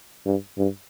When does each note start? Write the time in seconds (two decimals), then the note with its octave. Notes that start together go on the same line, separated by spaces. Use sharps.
0.26 G2
0.58 G2